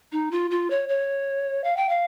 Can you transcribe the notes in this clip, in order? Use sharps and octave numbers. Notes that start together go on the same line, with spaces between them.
D#4
F4
F4
C#5
C#5
F5
G5
F5